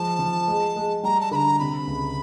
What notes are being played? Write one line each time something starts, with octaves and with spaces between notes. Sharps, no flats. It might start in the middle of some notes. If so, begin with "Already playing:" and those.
Already playing: F3 G#3 A5
F3
G#3
G#3
G3 A#5
A5
D3 A#5 B5
C3 B5
C#2